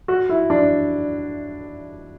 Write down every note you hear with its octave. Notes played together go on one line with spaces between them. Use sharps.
F#4
E4
D4